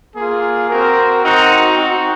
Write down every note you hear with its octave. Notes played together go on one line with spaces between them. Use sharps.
A#3 F4 G#4
C4 F#4 A#4
C4 D#4 F#4
C4 D#4 F#4